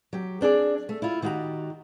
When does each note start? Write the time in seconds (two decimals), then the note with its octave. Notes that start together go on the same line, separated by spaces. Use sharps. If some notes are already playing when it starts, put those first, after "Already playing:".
0.13 F#3 G4
0.41 C4 D4 G#4 D5
0.89 A3
1.02 E4 F4
1.22 D#3 E4 F#4 G4 A#5